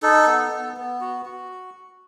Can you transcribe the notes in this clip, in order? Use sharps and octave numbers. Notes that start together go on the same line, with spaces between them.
D#4 A4
B3
B3
B3
F#4
F#4